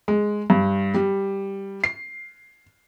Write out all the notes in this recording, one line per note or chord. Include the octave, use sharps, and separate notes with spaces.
G#3
G2
G3
C7